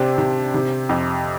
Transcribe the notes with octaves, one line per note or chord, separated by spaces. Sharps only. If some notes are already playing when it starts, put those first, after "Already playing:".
Already playing: C3 D4 G4 C5
C3
C3
F2